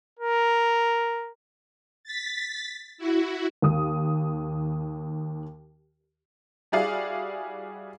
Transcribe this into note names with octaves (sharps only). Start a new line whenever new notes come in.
A#4
A6 B6
E4 F#4
D#2 D#6
G3 E4 F#4 G#4 D5 F5